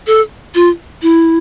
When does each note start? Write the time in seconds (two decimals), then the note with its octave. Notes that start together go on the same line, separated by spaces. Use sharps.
0.07 A4
0.55 F4
1.02 E4